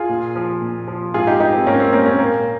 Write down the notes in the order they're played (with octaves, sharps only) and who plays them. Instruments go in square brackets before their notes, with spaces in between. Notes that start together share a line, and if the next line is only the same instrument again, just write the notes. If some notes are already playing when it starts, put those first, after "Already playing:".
Already playing: [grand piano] F4 G#4
A#2
F3
A#2
F3
G#2 F4 G#4
D#4 G4
G3 D#4 G4
C4
G#2 A#3 C#4
C4
G3 A#3 C#4
A#3 C#4
A#2 A#3